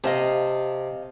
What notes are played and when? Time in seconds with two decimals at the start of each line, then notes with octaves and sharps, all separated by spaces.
0.04 C3 D#5 F5 A5